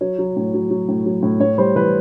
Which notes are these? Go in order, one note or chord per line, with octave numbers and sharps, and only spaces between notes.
F#3 C#5
F#3
A2
F#3
F#3
A2
F#3
A2
A2 C#5
G3 C5
E3 B4